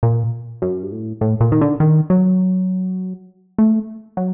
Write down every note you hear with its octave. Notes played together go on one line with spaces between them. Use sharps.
A#2
F#2
G2
A2
A2
A#2
D#3
D3
D#3
F#3
A3
F#3